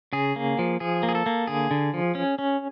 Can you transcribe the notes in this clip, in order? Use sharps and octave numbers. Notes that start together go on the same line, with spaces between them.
C#3 G#4
A#3
F3
F3 G#4
A#3
G#4
A4
A#3
D3 G#4
D3
F3
C#4
C#4